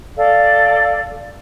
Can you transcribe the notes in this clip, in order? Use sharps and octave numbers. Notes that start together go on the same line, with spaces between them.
A4 D5 F5